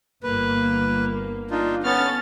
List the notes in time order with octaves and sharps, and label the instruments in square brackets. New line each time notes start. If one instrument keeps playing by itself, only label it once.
[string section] G1 A#3 [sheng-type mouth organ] B4
[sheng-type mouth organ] D4 D#4 F4
[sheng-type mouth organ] B3 F6 [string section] C#4 A4 A6